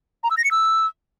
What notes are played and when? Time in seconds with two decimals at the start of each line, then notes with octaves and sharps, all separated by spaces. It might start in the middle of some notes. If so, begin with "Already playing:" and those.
0.24 A#5
0.31 E6
0.37 A#6
0.44 C#7
0.51 E6